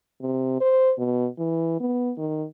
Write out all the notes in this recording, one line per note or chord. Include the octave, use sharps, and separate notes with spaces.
C3
C5
B2
E3
B3
D#3